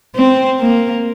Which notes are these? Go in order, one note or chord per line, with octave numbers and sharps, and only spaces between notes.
C4
A#3